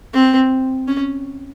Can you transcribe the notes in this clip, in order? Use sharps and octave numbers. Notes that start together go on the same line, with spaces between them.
C4
C#4